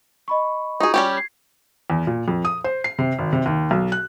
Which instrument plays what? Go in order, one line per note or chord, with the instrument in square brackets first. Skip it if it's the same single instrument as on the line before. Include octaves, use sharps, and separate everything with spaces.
[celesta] D#5 B5 C#6
[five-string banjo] D#4 G#4 [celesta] F4 F#4 C#6
[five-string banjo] G3 C#4 G4
[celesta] G#6 C7
[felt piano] E2
A#2
F2
D#6
C5
C7
C3
G#1
C3
D#2
B1
F#6